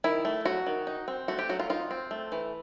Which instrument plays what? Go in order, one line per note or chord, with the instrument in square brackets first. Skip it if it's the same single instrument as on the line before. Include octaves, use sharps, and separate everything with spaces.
[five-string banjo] D#3 E4
A3
F#3 F#4
D#3
D#4
C4
A3 F#4
G4
F#3 F#4
F4
D#4 F4
C4
A3
E3